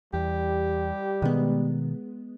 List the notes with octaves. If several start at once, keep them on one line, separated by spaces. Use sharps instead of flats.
E2 G3 G4
B2 D#3 G#3 B3